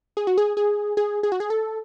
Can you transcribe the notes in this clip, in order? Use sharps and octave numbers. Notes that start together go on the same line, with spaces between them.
G#4
F#4
G#4
G#4
G#4
G#4
F#4
G#4
A4